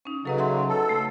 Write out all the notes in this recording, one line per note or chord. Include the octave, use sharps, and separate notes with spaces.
C#4 D#4
C#3 F#3 A4 B4 D#5
E5 F#5 C6
A4
A3